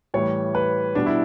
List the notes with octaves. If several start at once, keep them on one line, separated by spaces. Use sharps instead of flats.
A2 E3 G3 C#5
B4
B2 G3 D4
E4